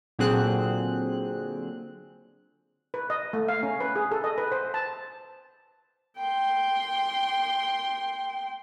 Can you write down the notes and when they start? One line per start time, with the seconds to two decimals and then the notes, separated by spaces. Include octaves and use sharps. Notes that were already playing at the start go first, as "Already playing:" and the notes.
0.19 A#2 D3 F#3 C4 G#4 F#6
2.94 B4
3.10 D#5
3.33 A3
3.48 F5
3.63 C#4
3.80 B4
3.95 G#4
4.11 A4
4.24 D#5
4.38 B4
4.52 C5
4.74 A5
6.18 G5 C6